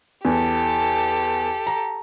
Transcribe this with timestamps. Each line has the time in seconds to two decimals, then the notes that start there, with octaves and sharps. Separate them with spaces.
0.25 E2 G4 A4
1.67 A#5